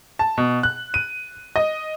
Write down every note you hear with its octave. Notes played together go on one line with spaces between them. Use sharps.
A5
B2
F#6
D#7
D#5